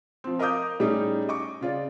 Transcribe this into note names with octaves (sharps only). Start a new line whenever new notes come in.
F3 C4
A#4 D#5 F5 D6 D#6 G6
A2 G3 C#4 D#4 G#4
D#5 C#6 D6
C#3 F4 D5